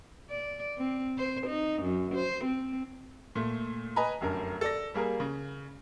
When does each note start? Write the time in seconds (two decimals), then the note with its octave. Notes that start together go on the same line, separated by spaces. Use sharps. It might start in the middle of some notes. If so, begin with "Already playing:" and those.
0.30 D5
0.78 C4
1.18 C5
1.47 D#4
1.82 F#2
2.15 C5
2.45 C4
3.35 A#2 A3
3.96 B4 D#5 G#5 A#5 B5
4.21 F1 F#2 D3 A#4
4.61 A4 D5 A#6
4.94 G3 A#3 G#4 A#4
5.20 C#3